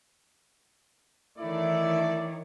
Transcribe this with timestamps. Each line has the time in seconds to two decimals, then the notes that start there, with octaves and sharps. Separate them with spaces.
1.38 D#3 E3 A3 E4 C#5 D5